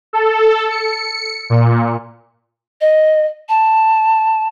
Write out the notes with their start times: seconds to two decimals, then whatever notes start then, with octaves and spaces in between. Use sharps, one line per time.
0.13 A4
0.70 C#7
1.50 A#2
2.81 D#5
3.49 A5